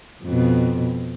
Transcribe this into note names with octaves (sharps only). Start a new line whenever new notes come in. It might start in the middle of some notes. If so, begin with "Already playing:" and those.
F2 B2